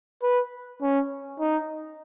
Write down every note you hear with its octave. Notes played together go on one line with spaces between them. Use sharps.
B4
C#4
D#4